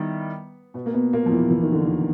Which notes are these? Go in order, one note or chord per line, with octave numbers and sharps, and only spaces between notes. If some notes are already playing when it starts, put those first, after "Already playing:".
Already playing: D#3 G3 B3 E4
B2 B3
A#3
B2 B3
A#2 A#3
F3
E2 E3
E3
D#3
D3
D#2 D#3